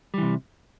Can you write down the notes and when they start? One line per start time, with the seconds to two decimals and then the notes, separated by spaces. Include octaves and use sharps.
0.14 G3
0.18 E3
0.22 C3